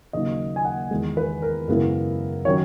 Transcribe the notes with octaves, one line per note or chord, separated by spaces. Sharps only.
D#2 C#3 F#3 A#3 D#4 D#5
G#5
F#5
E2 D#3 G#3
B4
A#4
F#2 C#3 G#3 B3 E4 A#4
D#3 F#3 C#4 C#5